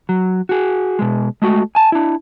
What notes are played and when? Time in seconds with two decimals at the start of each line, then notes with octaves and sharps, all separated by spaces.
0.09 F#3
0.49 F#4 G#4
0.99 B2 G#3
1.42 G#3 A3 F#4
1.75 G#5 A5
1.92 D4 E4